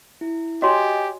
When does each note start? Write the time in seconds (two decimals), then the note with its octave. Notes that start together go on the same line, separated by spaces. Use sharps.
0.21 E4
0.62 F#4 G4 C#5 D#5 G#5 C6